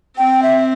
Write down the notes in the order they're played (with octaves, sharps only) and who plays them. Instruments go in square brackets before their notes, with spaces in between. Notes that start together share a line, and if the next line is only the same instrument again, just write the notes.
[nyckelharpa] C4 [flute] G5
[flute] E5